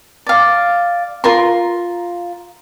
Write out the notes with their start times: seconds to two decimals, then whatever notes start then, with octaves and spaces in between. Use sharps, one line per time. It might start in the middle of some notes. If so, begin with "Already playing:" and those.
0.27 D5 F5
1.24 F4 A#4 C6